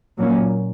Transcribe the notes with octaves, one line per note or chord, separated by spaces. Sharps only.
A#2 F#3 A#3 C#4